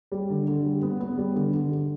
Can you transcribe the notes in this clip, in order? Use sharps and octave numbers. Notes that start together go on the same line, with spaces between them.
G3
D3
D3
G3
B3
B3
G3
D3
D3
D3